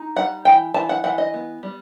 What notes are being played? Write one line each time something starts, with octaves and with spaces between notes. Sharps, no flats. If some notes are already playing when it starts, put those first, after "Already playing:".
Already playing: D#4
G3 F#5
E3 G5
E3 A5
F#5
E3 F#5
D#5
B3
G3